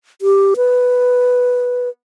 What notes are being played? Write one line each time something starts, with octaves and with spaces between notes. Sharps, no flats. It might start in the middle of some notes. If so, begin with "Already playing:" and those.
G4
B4